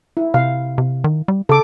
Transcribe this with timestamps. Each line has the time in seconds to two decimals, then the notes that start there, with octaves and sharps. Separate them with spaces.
0.17 E4
0.34 C3 F5
0.78 C3
1.04 D#3
1.28 G3
1.49 C#3 A4 D6